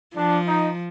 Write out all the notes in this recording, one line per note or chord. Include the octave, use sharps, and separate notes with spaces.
F3 D4
D#4